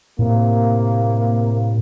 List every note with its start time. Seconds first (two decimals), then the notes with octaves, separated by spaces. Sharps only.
0.19 A2 C3 A#3